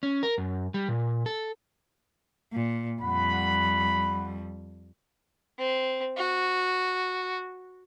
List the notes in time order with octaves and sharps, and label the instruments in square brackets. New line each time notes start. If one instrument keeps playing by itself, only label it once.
[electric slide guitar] C#4
A#4
F#2
G3
A#2
A4
[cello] A#2
[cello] F2 G3 [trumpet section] F#5 B5
[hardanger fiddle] C4
F#4